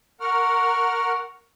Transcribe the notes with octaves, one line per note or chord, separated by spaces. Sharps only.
A#4 F#5 C#6 F6